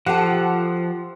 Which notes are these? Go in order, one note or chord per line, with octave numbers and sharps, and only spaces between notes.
F3 G4 A4 F#5